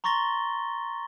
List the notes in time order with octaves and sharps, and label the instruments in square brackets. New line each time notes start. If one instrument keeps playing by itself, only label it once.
[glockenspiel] A#5 C6 C#6 A6 A#6 G7